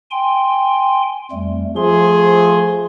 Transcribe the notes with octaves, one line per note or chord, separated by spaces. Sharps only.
G5 G#5 C6
F2 G3 A3
F3 A3 G#4 C6